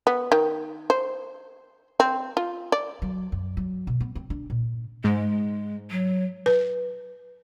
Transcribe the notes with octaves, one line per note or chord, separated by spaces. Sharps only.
B3
D#3
C5
C4
F4
D5
F#3
F#2
F#3
B2
B3
C4
D4
A#2
G#2 G#3
F#3
B4